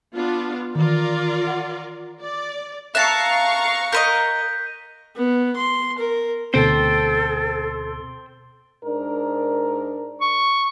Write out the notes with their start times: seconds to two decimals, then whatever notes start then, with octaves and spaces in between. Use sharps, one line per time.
0.13 B3 D4 F4
0.75 D#3 E3 F4 A#4 D5
1.47 F#5
2.22 D5
2.95 E5 F5 A5 A#5 C#6 F#6 A#6 C#7
3.92 A#4 C5 D#5 G6 B6 D#7
5.16 B3
5.56 C6
5.98 A#4
6.54 D2 B2 C4 A4 C5 G5
8.85 G#2 D4 A#4
10.21 C#6